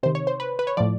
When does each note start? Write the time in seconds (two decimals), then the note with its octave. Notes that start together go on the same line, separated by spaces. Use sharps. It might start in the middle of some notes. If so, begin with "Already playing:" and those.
0.03 C3 D#3 C5
0.15 C#5
0.27 C5
0.40 B4
0.59 B4
0.67 C#5
0.77 A2 F3 D5